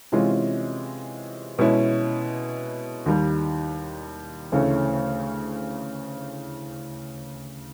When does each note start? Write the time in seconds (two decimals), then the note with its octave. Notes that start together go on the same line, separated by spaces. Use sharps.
0.12 C3 E3 G#3 C#4 F4
1.59 B2 G#3 C#4 E4
3.06 D#2 D#3 G3
4.52 D2 C#3 E3 A3 C#4